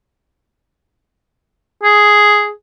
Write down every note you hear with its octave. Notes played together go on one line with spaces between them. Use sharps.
G#4